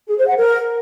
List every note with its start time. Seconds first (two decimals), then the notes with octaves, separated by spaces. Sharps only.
0.08 G#4
0.17 C5
0.27 F#5
0.36 A#4